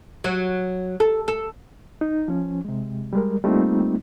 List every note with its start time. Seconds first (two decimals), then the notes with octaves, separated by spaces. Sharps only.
0.24 F#3
1.00 A4
1.28 A4
2.01 D#4
2.28 F3 C#4
2.65 C3 G#3
3.13 G3 G#3 A#4
3.44 G3 A3 A#3 C4 D#4 F4